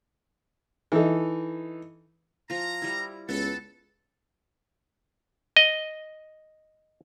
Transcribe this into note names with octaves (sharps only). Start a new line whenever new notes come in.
E3 D#4 A4
F3 F4 A#5
G3 E4
C#2 B3 A4
D#5